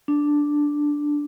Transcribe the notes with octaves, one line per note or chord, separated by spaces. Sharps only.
D4